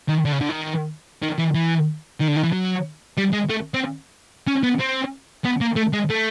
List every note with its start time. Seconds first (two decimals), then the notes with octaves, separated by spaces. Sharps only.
0.09 D#3
0.25 D3
0.32 C#3
0.41 D3
0.49 D#3
1.23 D#3
1.38 E3
1.54 E3
2.20 D#3
2.28 D3
2.36 D#3
2.43 E3
2.52 F#3
3.18 G3
3.33 G#3
3.50 A3
3.74 C4
4.47 C#4
4.63 B3
4.79 C4
5.45 B3
5.61 A#3
5.76 A3
5.93 G#3
6.10 A3